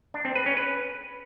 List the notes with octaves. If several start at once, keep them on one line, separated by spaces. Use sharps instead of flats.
D4
C4
B4
C#4
B4